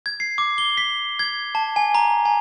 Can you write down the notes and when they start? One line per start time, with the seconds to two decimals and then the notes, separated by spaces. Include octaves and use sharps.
0.06 G#6
0.20 C7
0.38 D6
0.58 G7
0.77 B6
1.19 G#6
1.55 A5
1.76 G#5
1.95 A#5
2.25 G#5